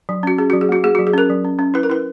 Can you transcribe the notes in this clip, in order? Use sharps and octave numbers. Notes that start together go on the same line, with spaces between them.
F#3
C#4 F#4
C#4 G#4
F#3 F#4
G#4
A#3 F#4
A#3 G#4
F#4
F#3
G#4
C#4 A#4
F#3
C#4
C#4
E4 B4
A#4
E4 B4